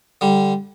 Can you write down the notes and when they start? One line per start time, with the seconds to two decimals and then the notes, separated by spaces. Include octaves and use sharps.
0.21 D3 G3